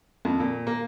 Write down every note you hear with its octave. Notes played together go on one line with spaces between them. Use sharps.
F2
A#2
A#3